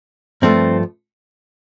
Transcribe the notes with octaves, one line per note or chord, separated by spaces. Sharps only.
G2 F3 A3 C4